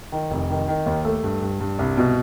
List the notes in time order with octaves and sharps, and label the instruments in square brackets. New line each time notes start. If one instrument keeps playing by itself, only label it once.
[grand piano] D#3
F1
D#3
D#3
D#2
A3
G2
G2
G2
C2
B2